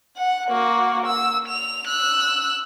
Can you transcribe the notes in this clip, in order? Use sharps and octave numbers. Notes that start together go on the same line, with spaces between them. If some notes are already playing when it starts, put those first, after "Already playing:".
F#5
A#3 F#4
E6
F7
E6 F#6